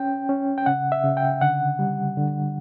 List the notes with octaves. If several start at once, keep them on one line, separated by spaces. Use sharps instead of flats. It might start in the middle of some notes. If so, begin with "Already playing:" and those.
Already playing: C#4 G5
C#4
G5
C#3 F#5
E5
C#3
G5
D3 F#5
G3
D3